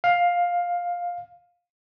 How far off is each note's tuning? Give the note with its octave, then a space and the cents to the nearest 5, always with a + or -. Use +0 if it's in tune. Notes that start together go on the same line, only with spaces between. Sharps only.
F5 +10